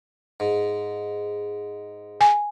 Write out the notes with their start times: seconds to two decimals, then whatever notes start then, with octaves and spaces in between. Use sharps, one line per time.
0.40 G#2
2.21 G#5